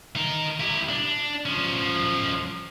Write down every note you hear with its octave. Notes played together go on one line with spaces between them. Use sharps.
D#4 A#4
E4 G4
D4
F3 C#4